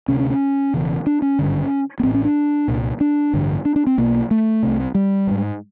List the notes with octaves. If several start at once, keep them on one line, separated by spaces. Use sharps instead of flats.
D2 C3 C#4
C#4
C#4
E1 E2 C#3
D4
C#4
G#1 G2 D3
B3
A1 A2 C4
C#4
D4
C2 A#2
D4
A1 G2 D3
D4
D4
C4
B1 B2 A#3
A3
C2 C3
G3
A1
G#2